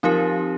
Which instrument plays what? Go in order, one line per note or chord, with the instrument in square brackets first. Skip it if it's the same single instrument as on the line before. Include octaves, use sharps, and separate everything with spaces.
[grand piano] F3 F4 [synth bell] C4 D#4 G4 A#4